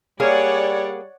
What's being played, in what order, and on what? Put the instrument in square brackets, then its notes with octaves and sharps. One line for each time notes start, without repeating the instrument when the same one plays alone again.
[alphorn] G3 [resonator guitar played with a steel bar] A#3 G#4 [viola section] C#5 D5 F#5